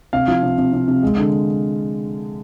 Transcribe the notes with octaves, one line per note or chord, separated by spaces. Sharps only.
C3 F5
F3
C3
C3
C3
C3
G#3
D3